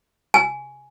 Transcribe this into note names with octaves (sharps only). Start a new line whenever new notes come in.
G#5